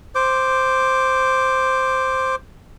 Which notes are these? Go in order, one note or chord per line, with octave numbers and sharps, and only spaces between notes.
C5 D6